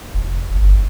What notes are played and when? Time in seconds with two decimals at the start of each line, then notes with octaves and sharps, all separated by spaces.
0.14 F1
0.54 G1